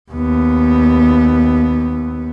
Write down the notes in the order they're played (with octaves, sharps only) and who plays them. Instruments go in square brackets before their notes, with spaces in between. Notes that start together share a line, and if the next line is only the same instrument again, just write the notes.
[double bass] D#2 B3